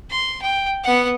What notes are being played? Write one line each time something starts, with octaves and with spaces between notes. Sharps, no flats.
C6
G5
B3 F#5